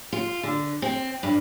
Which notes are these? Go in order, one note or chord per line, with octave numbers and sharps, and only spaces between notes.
F4
D3
C4
G2